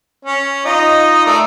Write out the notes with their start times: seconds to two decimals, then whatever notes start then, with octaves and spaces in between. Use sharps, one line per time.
0.25 C#4
0.65 D#4 F4 D#5
1.26 A3 A#4 D5